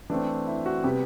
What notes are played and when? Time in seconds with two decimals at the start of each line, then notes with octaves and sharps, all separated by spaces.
0.10 E3 A3 C4 D4
0.47 E4
0.66 F#4
0.84 C3 G3 B3 G4